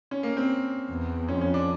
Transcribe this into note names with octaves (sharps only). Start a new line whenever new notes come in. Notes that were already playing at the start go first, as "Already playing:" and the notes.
C#4
A#3
C4
E2
F2 C#4
C#4
D4